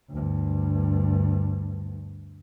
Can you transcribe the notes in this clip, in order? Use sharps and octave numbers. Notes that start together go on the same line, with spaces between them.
D2 G2